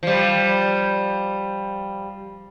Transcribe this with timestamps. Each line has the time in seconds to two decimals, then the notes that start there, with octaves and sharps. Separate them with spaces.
0.03 F3 G3